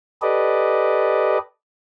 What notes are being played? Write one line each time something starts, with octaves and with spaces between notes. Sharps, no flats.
G4 A4 B4 D5 D#5